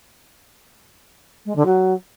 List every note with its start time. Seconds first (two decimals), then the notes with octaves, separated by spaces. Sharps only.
1.45 G#3
1.56 D3
1.66 F#3